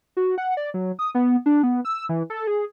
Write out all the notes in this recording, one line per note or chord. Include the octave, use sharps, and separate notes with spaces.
F#4
F#5
D5
F#3
D#6
B3
D4
B3
E6
E3
A4
G#4